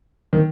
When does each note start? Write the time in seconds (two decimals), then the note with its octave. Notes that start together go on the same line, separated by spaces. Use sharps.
0.33 D#3